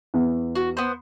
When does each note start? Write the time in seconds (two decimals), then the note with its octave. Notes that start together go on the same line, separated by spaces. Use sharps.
0.14 E2
0.55 F#4
0.77 B3 C5